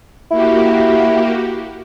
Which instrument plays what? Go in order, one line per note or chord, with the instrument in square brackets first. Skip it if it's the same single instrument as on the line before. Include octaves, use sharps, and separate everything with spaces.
[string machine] A#3 F#4 G4 [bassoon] E4